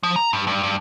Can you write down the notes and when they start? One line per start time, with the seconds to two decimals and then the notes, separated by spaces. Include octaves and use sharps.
0.03 F3
0.16 A#5
0.33 G2
0.47 G2
0.63 G2